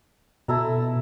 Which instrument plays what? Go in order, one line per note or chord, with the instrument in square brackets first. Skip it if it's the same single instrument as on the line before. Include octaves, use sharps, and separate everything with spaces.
[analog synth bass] B2 [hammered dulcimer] E4 A4 A#5